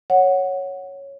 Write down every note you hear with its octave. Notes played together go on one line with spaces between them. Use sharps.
C#5 F#5